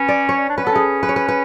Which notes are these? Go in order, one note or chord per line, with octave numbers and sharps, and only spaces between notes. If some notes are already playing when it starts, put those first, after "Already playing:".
Already playing: C#4 B4
D5
C#5
D4
C#4 B4
B3
A4
C#4 G#4
B4
C#5
B4
B4